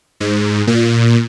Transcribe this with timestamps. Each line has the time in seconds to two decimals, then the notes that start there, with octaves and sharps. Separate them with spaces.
0.20 G#2
0.67 A#2